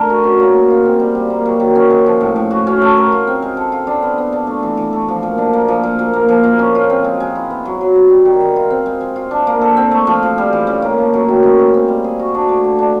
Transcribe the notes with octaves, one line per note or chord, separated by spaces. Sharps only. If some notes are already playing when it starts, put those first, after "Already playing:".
Already playing: A3 D4 A#4
F#4
C#4
A#3
A#4
F4
C4
G3
G3
A#3
F#3
D#3
C#4
G#3
F3
A2
A2
F#4
C#4
A3
A#4
F4
C4
G#3
A4
F4
D4
B3
B3
D4
A3
E3
E3
A3
F3
A#2
D4
A#3
F3
A#2
A#2
A#3
F3
A#2
C#4
F4
C4
G#3
G#3
E4
B3
F#3
F#3
B3
G3
D#3
D#3
F4
C4
G#3
G#3
F4
D4
A#3
A4
C4
A3
F3
F3
G3
E3
C#3
A#3
A3
F#3
D#3
C#4
E4
C4
G3
G#4
F#4
D4
A3
A4
D4